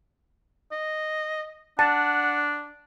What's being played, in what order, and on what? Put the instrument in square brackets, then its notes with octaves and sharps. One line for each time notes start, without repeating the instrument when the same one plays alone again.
[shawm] D#5
[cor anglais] D4 [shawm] F#5 [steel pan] A5